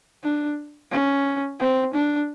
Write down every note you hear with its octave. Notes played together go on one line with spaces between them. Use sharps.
D4
C#4
C4
D4